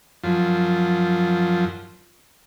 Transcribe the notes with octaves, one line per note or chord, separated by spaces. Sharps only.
F#2 F3